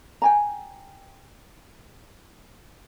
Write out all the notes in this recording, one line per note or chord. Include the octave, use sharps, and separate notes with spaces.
G5 G#5 A#5